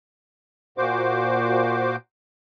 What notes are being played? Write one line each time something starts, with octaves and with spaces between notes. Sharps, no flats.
A#2 F#4 C5 D6